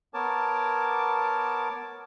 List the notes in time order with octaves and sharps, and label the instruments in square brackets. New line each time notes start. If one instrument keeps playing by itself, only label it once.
[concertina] B3 A#4 C#5 A5 D6